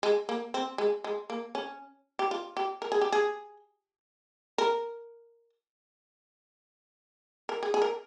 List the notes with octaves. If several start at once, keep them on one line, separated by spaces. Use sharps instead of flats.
G#3
A#3
C4
G#3
G#3
A#3
C#4
G4
F4
G4
A#4
G#4
G4
G#4
A#4
A#4
G#4
G#4
A#4